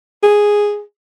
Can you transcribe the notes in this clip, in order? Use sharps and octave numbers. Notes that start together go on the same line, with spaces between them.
G#4